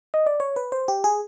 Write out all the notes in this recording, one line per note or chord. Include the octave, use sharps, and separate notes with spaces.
D#5
D5
C#5
B4
C5
G4
G#4